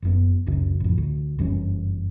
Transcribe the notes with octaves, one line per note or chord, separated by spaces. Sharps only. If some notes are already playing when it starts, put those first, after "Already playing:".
F#1 F#2 B3
F#1 C#2 F#2 C#3
A1 F2
D2
F#1 G2 E3 C#4